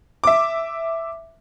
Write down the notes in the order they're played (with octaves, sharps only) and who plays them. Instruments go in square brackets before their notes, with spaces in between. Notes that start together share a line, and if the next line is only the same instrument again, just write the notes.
[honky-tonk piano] E5 D6